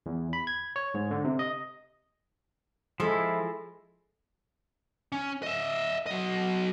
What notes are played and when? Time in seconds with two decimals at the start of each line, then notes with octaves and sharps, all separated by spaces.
0.06 E2
0.33 B5
0.47 G#6
0.76 C#5
0.94 G#2
1.11 D3
1.25 C3
1.39 D#5
3.00 F3 G#3 E4 A4
5.12 C#4
5.43 D#5 E5
6.06 F#3 D#5